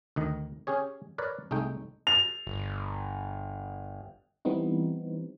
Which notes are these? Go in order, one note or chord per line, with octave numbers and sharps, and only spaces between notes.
D2 D#3 D#5
C#4 G4 G#4 C#5
A#4 B4 C#5 D5
C2 G#3 A3 D#4 G5
F7
G1
E3 G3 B3 C4 D#4